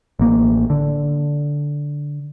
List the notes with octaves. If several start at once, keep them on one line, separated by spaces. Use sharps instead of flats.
A1 A#3
D3